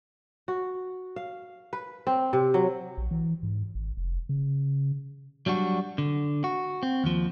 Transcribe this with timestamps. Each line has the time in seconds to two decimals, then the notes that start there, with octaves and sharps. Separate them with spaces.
0.48 F#4
1.16 F5
1.73 B4
2.07 C4
2.33 C3
2.54 F#3
2.98 A#1
3.11 E3
3.43 G#2
3.75 G#1
3.97 F1
4.29 C#3
5.46 F#3 G3 D4 F#4
5.98 D3
6.44 F#4
6.83 C4
7.04 D#2 F3